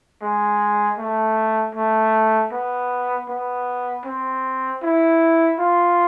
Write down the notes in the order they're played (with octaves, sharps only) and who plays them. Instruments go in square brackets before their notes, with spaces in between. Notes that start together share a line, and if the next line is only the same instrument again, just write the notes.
[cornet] G#3
A3
A3
B3
B3
C4
E4
F4